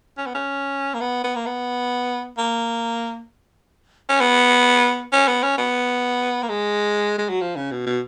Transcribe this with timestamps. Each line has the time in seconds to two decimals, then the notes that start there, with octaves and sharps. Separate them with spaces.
0.18 C#4
0.26 B3
0.34 C#4
0.94 A#3
1.00 B3
1.24 B3
1.35 A#3
1.46 B3
2.38 A#3
4.09 C#4
4.21 B3
5.12 C#4
5.28 B3
5.43 C#4
5.58 B3
6.43 A#3
6.49 G#3
7.18 G#3
7.29 F#3
7.41 F3
7.56 C#3
7.71 B2
7.86 B2